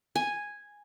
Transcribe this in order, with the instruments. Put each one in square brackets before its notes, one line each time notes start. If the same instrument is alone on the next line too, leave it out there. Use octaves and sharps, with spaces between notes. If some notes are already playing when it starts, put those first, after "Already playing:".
[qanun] G#5